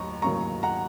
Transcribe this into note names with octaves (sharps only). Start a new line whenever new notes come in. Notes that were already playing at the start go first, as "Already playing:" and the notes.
Already playing: D#2 F#3 A#5 C#6
D#2 C#3 F#3 A#3 A#5 C#6
F#5 A#5